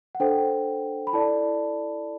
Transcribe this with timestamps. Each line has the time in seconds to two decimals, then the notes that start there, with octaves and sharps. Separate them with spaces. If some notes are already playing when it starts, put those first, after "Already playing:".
0.15 F#5
0.20 D4 A4 C5 G5
1.07 B5
1.13 E4 A4 D5 A5